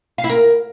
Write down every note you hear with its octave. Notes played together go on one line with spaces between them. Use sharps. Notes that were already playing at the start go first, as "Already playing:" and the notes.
F5
E4
A#4